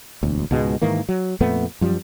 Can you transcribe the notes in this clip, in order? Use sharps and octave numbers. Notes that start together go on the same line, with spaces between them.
E1 D2
C#2 G#2 B2 G#3
G#2 D#3 E3 A#3
F#3
F2 A#2 A3 B3
F#2 F3 G3